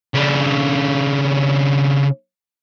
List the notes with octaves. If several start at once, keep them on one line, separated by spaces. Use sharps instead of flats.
C#3 D4